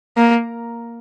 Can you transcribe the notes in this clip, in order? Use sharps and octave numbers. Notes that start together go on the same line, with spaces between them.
A#3